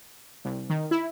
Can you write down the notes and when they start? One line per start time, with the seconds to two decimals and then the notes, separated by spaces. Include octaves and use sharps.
0.45 C2
0.70 D#3
0.91 E4